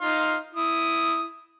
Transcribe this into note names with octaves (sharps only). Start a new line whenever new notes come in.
D#4 F5 C6
E4 D#6